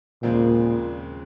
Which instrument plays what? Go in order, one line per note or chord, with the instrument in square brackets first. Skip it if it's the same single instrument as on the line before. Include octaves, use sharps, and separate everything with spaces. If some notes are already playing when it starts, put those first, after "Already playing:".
[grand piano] D#2 C#3 F3 G#3 C4 [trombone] A#2